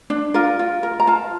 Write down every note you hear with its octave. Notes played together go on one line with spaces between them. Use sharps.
D4
F4 A#4
F4
A#4
A#5
F4 A5